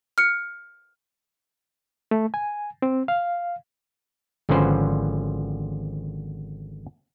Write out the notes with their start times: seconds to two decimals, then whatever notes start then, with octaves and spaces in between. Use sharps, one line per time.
0.18 F6 C#7
2.11 A3
2.34 G#5
2.82 C4
3.08 F5
4.49 G#1 D3 F3 C#4 B4 C5